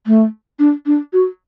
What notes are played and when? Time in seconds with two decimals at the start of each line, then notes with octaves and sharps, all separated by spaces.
0.07 A3
0.59 D4
0.86 D4
1.13 F#4